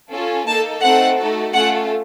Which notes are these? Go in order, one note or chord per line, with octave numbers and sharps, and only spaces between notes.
C#4 F4 A4
A#3 D#4 A4 A5
A3 C4 D#4 A4 F#5
A3 D#4 F#4 A4
A3 C#4 F4 A4 F#5